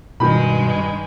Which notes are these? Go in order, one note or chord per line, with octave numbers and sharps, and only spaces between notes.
G2 B2 D#3 G#3 B5